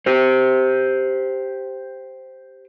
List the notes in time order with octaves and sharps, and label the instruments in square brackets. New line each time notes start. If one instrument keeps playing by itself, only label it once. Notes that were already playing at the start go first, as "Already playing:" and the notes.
[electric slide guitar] G4 C5